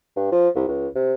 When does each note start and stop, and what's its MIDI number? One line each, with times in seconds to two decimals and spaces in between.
0.16 0.30 43
0.32 0.49 53
0.55 0.66 36
0.68 0.88 37
0.95 1.14 48